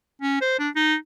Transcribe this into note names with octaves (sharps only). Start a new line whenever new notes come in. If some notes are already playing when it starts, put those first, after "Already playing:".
C#4
C5
D4
D#4